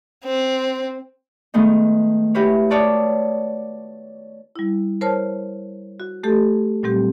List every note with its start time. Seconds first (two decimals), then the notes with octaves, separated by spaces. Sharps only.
0.24 C4
1.54 D#3 G#3 A3 B3 D#4
2.34 E4 F#4 G4 B4 C#5
2.70 C#5 D5 F#5 A5 D6 D#6
4.56 G3 E4
5.01 A#4 C5 C#5 A5 F6
6.00 F#4
6.23 A3 G4 A4
6.83 A#2 F#3 G3 C4 G4